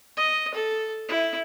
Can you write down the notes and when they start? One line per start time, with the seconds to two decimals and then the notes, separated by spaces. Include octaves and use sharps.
0.17 D#5
0.54 A4
1.08 E4